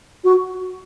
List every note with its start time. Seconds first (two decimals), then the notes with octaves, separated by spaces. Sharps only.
0.24 F#4